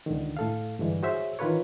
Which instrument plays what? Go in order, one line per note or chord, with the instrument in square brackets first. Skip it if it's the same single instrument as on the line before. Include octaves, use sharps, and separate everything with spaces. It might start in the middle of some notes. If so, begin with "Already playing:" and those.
[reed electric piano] C#2 D3 D#3
A2 A4 F5
G2 D3 E3 G#3
F#4 G#4 C5 C#5 E5
D#3 E3 F4 A#4 B4 C#5